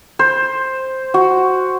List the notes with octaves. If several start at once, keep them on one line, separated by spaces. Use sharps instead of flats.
C5
F#4